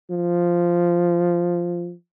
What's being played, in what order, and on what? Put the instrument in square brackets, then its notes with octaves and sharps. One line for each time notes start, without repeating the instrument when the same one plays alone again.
[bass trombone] F3